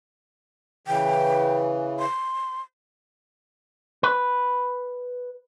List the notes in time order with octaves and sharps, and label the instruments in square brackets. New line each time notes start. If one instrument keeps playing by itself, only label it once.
[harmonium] C#3 E3 [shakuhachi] G5
[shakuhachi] C6
[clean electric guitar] B4